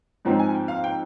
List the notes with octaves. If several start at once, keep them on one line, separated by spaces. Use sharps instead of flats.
G#2 F3 C4 D#4 A#5
G#5
G5
F5
G5